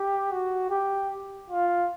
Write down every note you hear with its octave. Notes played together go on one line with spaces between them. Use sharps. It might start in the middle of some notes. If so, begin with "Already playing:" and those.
Already playing: G4
F#4
G4
F4